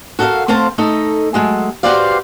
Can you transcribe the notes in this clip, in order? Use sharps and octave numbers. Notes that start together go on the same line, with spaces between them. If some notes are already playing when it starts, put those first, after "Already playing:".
F#4 A4 A#4 D#5 F5
A3 C4 C5 F5 A5
A3 D#4 A4 D#5
F#3 G#3 A3
F#4 G4 B4 C5 D5 F5